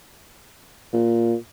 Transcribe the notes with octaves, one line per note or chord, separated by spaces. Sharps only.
A#2